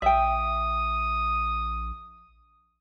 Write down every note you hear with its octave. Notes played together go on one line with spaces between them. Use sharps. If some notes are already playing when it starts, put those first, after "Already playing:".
A#1 E5 G5 D#6